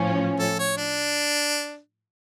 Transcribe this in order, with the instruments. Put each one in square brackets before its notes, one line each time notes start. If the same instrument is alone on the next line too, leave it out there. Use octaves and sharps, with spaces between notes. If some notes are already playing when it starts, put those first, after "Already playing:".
Already playing: [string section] A2 F3 C#4
[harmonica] A4
C#5
D4